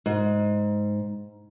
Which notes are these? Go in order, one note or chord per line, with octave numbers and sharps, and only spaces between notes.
G#2